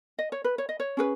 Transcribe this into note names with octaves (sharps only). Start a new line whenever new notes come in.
D#5
C#5
B4
C#5
D#5
C#5
C#4 G#4 B4